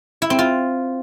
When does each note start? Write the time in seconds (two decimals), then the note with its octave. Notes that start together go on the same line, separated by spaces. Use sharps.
0.22 E4
0.30 C4
0.39 F4